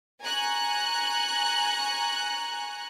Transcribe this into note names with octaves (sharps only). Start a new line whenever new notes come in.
G#5 A#5 C#6 F#6